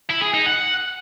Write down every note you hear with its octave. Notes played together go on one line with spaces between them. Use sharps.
E4
G#4
D#4
F#5